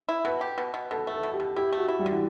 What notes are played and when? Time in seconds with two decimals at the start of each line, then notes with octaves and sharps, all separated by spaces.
0.09 E4
0.25 B2 B4
0.41 G4
0.58 B2
0.74 B2
0.91 B2 A4
1.07 A3
1.13 A4
1.23 B2
1.34 G4
1.40 B2
1.56 E4 G4
1.72 A3
1.77 F#4
1.88 E4
1.99 G3
2.06 D3
2.12 E3